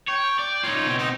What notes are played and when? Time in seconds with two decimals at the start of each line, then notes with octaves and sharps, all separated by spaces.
0.08 C#5 G5
0.39 D5
0.63 D#4 F4 C#5
0.86 B2 C4
0.98 D#4